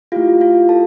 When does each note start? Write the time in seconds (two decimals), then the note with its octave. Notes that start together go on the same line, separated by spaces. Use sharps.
0.12 A3 E4 F4 G4 F5
0.41 F4 F5
0.69 A4 A5